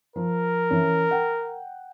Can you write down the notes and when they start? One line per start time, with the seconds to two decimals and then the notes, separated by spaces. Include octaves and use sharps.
0.16 F3 A#4
0.70 E3 C#4
1.11 F#5 G5